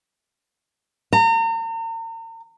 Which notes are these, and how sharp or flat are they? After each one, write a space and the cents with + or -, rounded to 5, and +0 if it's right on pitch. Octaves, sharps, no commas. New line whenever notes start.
A#5 -40